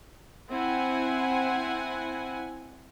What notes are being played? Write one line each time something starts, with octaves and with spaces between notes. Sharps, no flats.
C4 E4 F#5 G#5